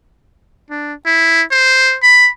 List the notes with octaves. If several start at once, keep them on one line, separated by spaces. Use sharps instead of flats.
D4
E4
C5
B5